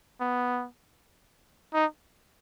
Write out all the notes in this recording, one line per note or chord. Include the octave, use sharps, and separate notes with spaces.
B3
D#4